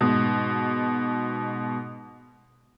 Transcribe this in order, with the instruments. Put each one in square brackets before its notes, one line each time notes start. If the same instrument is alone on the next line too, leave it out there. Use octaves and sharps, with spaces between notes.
[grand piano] G#2 B2